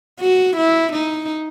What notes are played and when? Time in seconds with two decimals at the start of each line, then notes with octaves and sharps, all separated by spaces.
0.20 F#4
0.57 E4
0.92 D#4